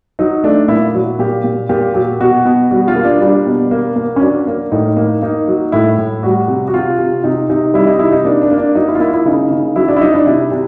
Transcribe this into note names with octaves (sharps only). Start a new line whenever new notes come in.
F#3 D#4
A3 D4
A#2 E4
F#3
A#2 G4
A#2
A#2 G4
F#3 G4
B2 F#4
B2
G3 F#4
F4
A#3
D4
G3 D4
B2
A#3
A#3
C#4
F#3 D4
A#3
A2 D#4
A#3
A#3 D#4
F#3
A2 E4
A2
G3 F#4
C3
F#4
C3 F4
C3
C3 D#4
C3 D#4
G3 E4
D#4
C3 E4
D#4
A#3 D4
D4
A#3
D4
F#3 D#4
E4
F4
A#3 E4
E4
C#3 D#4
C#3
F#3 E4
D4
E4
F#3 D#4
D4
C3 E4
C3